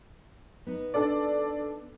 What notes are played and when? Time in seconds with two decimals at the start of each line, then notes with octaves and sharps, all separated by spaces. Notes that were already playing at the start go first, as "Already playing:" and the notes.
0.67 B3 D#4
0.94 D4 A4 D5